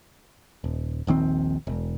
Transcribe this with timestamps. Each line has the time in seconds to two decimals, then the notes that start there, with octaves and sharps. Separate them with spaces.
0.64 D#1
1.07 D#1 A#1 D#3 C4
1.67 E1